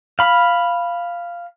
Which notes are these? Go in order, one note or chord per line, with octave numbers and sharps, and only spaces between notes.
F5 B5